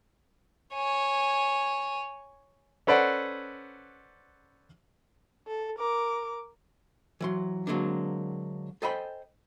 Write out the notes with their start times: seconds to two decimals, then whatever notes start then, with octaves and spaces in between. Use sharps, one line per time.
0.74 C#5 G#5
2.87 C#4 A4 B4 C5 D5 F#5
5.47 A4
5.79 A#4 D6
7.20 E3 F#3 C6
7.67 D3 F#3 G#3 A#3 C4 D4
8.82 A4 C5 D#5 G5 G#5 B5